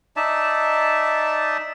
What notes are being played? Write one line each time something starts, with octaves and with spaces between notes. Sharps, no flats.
D#4 D5 E5 A5